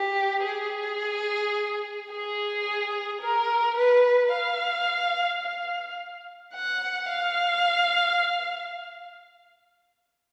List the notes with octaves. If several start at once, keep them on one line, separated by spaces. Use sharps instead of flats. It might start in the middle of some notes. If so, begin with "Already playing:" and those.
Already playing: G4
G#4
G#4
A#4
B4
F5
F5
F#5
F5